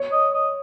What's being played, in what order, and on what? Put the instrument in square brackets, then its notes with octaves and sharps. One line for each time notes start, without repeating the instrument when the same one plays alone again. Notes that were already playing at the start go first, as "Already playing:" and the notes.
Already playing: [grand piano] C#5
[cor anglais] D#5
D#5